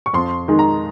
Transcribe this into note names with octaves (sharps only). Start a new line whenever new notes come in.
C#6
F2 C6
D#3 G#3 D#4
A#5